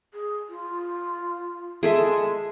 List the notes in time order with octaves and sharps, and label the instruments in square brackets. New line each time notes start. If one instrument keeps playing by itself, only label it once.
[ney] G#4
F4
[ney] G#3 [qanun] G#4 A4 E5